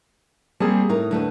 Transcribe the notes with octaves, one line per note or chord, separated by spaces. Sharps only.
G3 A#3 C4 G#4 A5
A2 D#4 A#4
D2 A3 B4